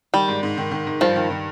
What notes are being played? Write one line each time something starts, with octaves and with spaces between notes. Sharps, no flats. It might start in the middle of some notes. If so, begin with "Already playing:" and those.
D#3 G3
G#2
G#2
D#3
D#3
D#3
G2 F3
D#3
D#3